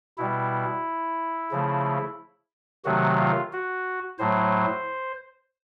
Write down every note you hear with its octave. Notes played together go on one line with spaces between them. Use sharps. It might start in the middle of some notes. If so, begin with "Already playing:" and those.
B2 G3 E4
C#3 F3 A3
C3 D#3 F#3 A3 F#4
F4
F#4
A2 F#3 A3 C5